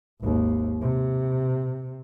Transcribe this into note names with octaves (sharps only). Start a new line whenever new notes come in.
G#1 D#2
C3